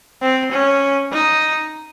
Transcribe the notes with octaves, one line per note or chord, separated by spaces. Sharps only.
C4
C#4
D#4